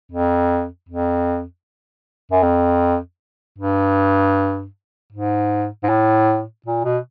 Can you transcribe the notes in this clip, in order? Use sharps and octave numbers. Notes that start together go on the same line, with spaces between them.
F2
F2
F#2
F2
G2
G#2
G#2
A2
A#2
B2